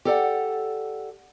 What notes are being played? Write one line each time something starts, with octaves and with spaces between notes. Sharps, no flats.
G4 A4 D5 F#5